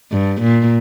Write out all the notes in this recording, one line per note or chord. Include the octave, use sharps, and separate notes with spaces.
G2
A#2